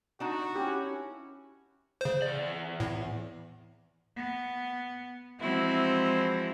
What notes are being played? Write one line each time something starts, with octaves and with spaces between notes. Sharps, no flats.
D4 D#4 F#4 A5
C#4 E4 G4
C#3 C5
E2 D5
A2
B3
E3 F3 G#3 C4 E4 F#4